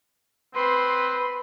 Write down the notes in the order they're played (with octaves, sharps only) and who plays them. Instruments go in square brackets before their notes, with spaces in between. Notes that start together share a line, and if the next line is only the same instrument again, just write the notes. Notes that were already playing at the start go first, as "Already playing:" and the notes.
[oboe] C4 [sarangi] B4 [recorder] C6